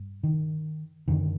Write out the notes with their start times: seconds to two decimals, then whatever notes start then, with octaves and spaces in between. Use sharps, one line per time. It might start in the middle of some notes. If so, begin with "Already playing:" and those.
Already playing: G2
0.24 D#3
1.08 F#2 D3 D#3